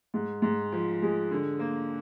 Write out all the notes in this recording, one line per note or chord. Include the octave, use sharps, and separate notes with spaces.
G#2
G#2
F3
G#3
D3
A#3